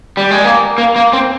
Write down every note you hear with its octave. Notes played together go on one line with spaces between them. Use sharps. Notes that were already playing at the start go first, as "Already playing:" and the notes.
G3
G#3
A#3
A#3
A#3
C4